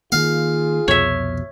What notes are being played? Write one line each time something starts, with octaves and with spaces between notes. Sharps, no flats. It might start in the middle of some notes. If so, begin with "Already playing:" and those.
D#3 A#3 F4 G#4 F5
C2 F2 B2 C#5 E5